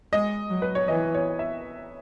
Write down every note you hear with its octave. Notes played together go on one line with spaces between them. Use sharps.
G#3 D#5
F#3
B4
C#5
E3 D#5
C#5
E5